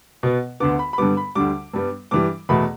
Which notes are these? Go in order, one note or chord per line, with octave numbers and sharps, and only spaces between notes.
B2 B3
D2 D3 B3 D6
B5
B5
G2 D3 G3 B3 D6
B5
D2 D3 G3 D6
G2 G3 B3
G2 E3 G3 D6
E2 B2 A3 B5